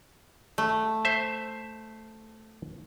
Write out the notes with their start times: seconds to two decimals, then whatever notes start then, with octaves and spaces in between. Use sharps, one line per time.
0.58 A3
1.05 C5 E5